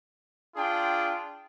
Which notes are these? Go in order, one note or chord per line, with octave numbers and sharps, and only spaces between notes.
D4 F4 G#4 G5